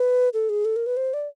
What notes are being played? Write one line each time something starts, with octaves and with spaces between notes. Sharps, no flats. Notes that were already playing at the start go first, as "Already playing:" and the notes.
Already playing: B4
A4
G#4
A4
A#4
B4
C5
D5